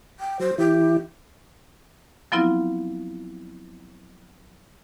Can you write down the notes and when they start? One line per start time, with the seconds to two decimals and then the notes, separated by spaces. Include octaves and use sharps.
0.20 G5
0.40 F#3 C5
0.58 E3 E4 G4
2.32 F3 F#3 B3 C4 E4 F4